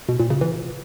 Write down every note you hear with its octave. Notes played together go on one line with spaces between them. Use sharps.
B2
A#2
C#3
E3